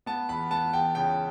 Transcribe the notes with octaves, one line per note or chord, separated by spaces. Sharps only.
B3 A5
E2 B5
B3 A5
E2 G5
C#3 G5